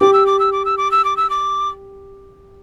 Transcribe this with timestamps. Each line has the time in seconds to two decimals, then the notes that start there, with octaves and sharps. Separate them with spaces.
0.01 G4 D6
0.13 E6
0.26 D6
0.39 E6
0.52 D6
0.65 E6
0.78 D6
0.92 E6
1.05 D6
1.17 E6
1.30 D6